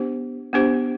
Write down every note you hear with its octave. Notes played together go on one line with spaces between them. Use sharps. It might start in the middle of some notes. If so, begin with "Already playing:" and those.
Already playing: B3 D4 G4 C5
B3 D4 G4 C5